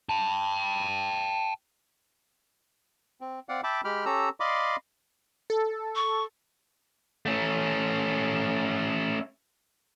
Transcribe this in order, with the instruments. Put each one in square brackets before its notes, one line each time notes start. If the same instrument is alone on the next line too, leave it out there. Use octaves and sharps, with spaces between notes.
[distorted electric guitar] G5 A5
[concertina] C4
C4 D5 F5 F#5
E5 G5 A5 B5 D6
G#3 G4 G5 B5 F6
C#4 G4 A4 A#5 E6
D5 D#5 F5 B5 C6 D6
[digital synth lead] A4
[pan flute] C#6
[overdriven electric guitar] A3 C#4